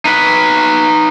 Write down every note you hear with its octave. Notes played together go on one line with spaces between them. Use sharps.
D#4 B4